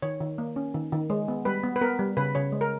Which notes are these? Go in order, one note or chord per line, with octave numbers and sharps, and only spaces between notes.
D#3 C#5
D#3
A#3
C#4
D#3
D#3
G#3
B3
G3 B4
B3
B4
B3 A#4
G3
C#3 B4
C#3 C#5
G#3
A#4